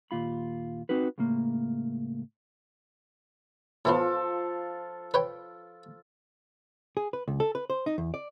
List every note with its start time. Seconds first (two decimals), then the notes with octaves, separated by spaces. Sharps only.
0.11 D#2 A#2 F4 B5
0.89 C4 D#4 F#4 B4
1.18 C#2 A2 A#3
3.85 A2 E3 F3 B3 F4 A4
5.14 B4 C#5 G5
6.97 G#4
7.13 B4
7.28 C#2
7.40 A4
7.55 B4
7.70 C5
7.86 D#4
7.98 E2
8.14 D5